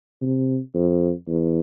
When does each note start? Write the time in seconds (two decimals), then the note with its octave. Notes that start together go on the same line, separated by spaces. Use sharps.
0.22 C3
0.75 F2
1.28 E2